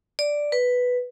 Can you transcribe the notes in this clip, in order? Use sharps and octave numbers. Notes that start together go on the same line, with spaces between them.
D5
B4